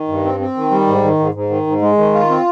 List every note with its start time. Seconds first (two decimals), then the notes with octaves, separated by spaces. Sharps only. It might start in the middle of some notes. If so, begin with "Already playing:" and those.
Already playing: D#3
0.08 G2
0.25 C4
0.40 C4
0.56 D#3
0.71 G3
0.87 G#2
1.03 D#3
1.20 G#2
1.34 G#2
1.50 D#3
1.67 G#2
1.82 G#3
1.98 D#3
2.14 F4
2.30 C4